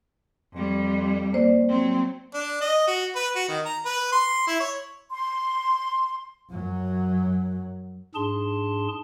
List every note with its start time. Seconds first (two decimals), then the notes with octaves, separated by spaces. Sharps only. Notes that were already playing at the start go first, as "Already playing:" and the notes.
0.53 F2 G3
1.33 A#3 C5 D5
1.69 F#3 C4
2.34 D4
2.61 D#5
2.87 F#4
3.15 B4
3.35 F#4
3.48 D#3
3.65 A#5
3.85 B4
4.12 C6
4.47 E4
4.60 C#5
5.11 C6
6.51 F#2 F#3
8.15 G#2 D4 G#4 A5 C6